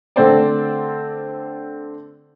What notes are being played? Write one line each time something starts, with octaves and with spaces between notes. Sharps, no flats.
D3 A3 C4 C5 D5